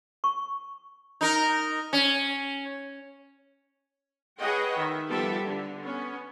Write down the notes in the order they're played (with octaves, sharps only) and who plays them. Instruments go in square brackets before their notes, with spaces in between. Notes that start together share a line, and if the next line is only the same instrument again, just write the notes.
[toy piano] C#6
[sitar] D#4 A#4
C#4
[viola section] G#4 B4 C#5 D#5 F#5 G5
D#3 E5
F3 G3 B3 G4 A4 E5
D3
B3 C#4